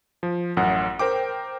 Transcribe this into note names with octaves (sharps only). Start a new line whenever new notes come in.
F3
A1 F#2 F#5
A#4 C5 G5 D6